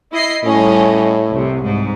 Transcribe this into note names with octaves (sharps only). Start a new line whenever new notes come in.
E4 D#5 C7
A2 G3 C#4 D#5
C2 C3
G#2